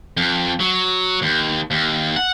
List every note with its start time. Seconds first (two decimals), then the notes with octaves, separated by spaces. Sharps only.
0.17 F2
0.60 F#3
1.22 D#2
1.71 D#2
2.16 F#5